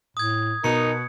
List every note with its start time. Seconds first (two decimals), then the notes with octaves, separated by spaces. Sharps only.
0.17 A2 D#6 G#6
0.64 B2 D#4 A#4 C#7